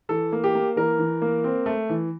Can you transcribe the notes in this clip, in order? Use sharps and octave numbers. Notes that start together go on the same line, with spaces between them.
E3 A4
A#3
G4
A#3
E3 A#4
E3
A#3
C4
A3
E3